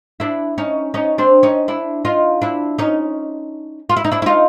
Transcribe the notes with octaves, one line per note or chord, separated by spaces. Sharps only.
D4 E4
C#4 D#4
C#4 D#4
C4 D4
C#4 D#4
D4 E4
D#4 F4
D4 E4
C#4 D#4
F4
E4
D#4
D4 E4
E4
D#4 F4